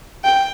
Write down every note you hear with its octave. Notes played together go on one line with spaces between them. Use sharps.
G5